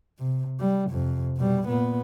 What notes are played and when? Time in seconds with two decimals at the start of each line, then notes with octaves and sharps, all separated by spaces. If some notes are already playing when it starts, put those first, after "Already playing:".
0.19 C3
0.60 G3
0.90 F2 C3
1.37 B2 G3
1.68 A#2 B3